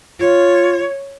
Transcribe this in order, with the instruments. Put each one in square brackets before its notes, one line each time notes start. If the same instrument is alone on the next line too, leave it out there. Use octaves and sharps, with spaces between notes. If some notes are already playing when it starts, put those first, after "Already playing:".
[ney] F4 [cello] C#5